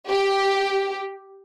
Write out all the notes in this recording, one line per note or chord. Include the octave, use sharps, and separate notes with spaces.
G4